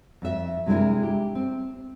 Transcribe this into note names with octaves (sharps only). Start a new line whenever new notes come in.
F2 E5
C3 G#3 D4 E4 A#4
G4
C4